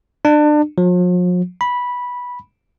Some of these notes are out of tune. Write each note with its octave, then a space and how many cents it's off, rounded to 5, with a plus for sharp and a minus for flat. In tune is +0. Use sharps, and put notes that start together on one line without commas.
D4 +30
F3 +45
B5 -10